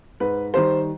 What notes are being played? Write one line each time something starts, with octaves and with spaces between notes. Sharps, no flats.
G#2 B4
D#3 G3 C5